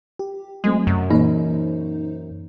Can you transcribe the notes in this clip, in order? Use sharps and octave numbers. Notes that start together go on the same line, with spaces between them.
G4
F#3 G#3 A3 C4
F#2 C3
A#2 E3 A#3 D#4 C5